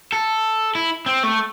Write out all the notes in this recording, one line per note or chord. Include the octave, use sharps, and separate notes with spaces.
A4
E4
C4
A3